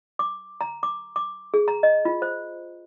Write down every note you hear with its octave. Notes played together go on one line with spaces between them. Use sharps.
D6
A#5
D6
D6
G#4
A#5
D#5
F4
C5